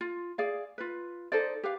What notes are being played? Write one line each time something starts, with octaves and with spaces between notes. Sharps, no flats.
F4
G#4 D5 F5
F4 B4
D#4 A4 C5 D5
G4 B4 F5